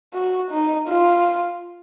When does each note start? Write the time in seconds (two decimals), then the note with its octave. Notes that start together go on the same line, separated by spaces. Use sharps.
0.14 F#4
0.51 D#4
0.88 F4